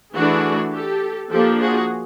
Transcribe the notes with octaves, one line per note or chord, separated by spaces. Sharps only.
E3 A3 D4 F#4 G#4
G4 A4
F3 A#3 D4 G4 A4
F#4 G#4